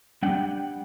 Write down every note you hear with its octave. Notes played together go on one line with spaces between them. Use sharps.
G3 D4 F#5 G5